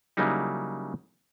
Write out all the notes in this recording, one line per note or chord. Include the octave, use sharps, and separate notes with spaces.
C#3 F#3 G3 A#3 D#4 E4